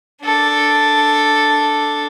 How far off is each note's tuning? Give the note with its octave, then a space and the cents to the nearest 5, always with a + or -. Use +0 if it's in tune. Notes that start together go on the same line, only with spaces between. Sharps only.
D4 +0 A4 +0